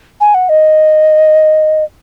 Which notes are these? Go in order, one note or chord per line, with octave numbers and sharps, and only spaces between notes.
G#5
F#5
D#5